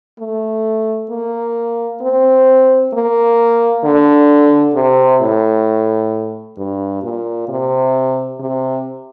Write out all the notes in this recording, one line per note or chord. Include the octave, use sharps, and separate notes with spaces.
A3
A#3
C4
A#3
D3
C3
A2
G2
A#2
C3
C3